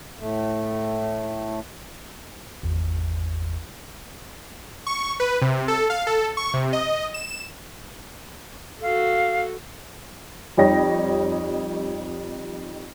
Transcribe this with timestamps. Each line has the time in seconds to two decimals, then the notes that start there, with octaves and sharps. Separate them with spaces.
0.19 A2 A3
2.63 G#1 E2
4.87 C#6
5.20 B4
5.42 C3
5.68 A4
5.90 F5
6.07 A4
6.37 C#6
6.54 C3
6.73 D#5
7.14 E7
8.81 F#4 A4 F5
10.57 F2 G3 D#4 C#5 G5 A#6